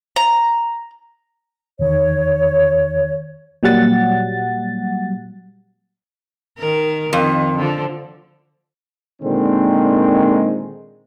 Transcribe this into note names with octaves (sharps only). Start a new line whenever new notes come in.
A#5
E2 D#3 C#5
A#2 F#3 G3 F#5 A6
D#3 A#4
F2 D#3
D3 F3
A#2 D3 D#3 G#3 C4